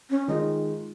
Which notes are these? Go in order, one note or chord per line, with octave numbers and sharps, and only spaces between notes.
C#4
D#3 G#3 D#4 F4